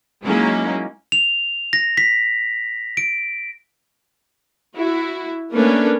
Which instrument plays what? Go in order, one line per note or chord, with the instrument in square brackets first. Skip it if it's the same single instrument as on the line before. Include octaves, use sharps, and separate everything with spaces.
[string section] F#3 G#3 A#3 C#4 D#4 E4
[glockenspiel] F7
A#6
B6
D7
[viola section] E4 F#4
A3 A#3 C#4 D4 A#4 B4